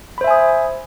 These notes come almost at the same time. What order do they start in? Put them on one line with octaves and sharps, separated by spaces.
B5 C5 E5 G#5 D#6